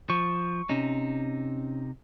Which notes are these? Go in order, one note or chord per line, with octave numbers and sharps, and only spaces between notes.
F3 C#6
C3 C#4 D#4